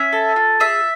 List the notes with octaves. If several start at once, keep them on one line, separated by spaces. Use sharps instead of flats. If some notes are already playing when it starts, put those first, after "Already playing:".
Already playing: C#4 E5
A4
F4
G#4 E5